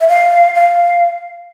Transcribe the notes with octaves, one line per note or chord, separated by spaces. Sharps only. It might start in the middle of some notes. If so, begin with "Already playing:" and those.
E5
F5
F5